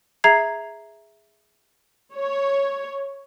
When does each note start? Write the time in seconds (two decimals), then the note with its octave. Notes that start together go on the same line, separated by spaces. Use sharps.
0.24 G#4 E5 A#5 G#6 C7
2.15 C#5